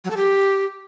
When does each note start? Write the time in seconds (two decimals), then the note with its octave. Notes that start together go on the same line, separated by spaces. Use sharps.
0.05 F#3
0.11 A4
0.17 G4